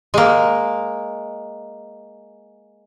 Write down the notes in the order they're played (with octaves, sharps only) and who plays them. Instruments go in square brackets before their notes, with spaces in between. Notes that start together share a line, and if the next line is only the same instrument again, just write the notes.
[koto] G#3 A#3